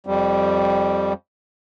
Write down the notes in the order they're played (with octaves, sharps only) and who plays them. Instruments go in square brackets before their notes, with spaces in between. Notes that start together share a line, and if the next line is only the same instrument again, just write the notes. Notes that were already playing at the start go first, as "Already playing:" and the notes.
[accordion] F2 G3